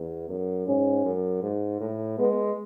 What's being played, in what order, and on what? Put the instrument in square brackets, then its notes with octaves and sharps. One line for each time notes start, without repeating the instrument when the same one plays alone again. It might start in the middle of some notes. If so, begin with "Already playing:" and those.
Already playing: [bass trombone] E2
F#2
[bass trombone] G#2 [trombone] C#4
[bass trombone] F#2
G#2
A2
[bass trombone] G#3 [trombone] B3